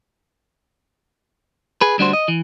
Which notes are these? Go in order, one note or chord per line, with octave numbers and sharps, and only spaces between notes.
G#4 B4
D2 G3 D4 F#4 C5
D#5
E3